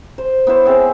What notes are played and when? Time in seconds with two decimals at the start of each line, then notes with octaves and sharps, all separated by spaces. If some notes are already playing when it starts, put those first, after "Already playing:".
0.18 C5
0.47 B3 E4 C5 C#5
0.65 B3 C4 G#4 E5